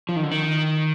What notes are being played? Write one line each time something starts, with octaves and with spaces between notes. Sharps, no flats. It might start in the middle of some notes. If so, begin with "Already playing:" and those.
F3
D#3
D3
D#3